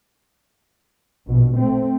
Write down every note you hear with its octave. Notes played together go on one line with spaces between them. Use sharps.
A#1 B2
A3 C4